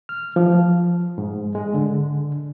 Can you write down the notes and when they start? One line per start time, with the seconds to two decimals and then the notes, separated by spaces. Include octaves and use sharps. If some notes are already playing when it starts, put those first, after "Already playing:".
0.09 F6
0.36 F3
1.18 G#2
1.55 G#3
1.74 D3